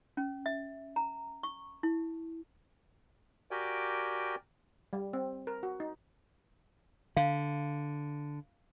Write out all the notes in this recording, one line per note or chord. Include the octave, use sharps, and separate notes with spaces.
C#4
E5
A#5
C#6
E4
F#4 G4 A#4 D5 G5 G#5
G3
C4
A#4
F#4
D#4
D3 F5